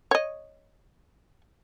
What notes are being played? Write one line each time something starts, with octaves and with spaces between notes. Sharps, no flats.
C#5 D#5